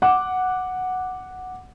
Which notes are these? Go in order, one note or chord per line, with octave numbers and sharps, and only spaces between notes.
F#5 D6